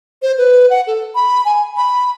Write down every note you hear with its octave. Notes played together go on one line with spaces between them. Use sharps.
C5
B4
F#5
A4
B5
G#5
B5